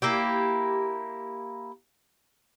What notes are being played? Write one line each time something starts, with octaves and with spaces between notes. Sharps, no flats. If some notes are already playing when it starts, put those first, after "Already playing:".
A#3 E4 G4